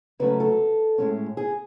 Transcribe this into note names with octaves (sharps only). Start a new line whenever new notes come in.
C#3 F#3 A3 C#4 B4
A4
A2 G#3 C#4
G#4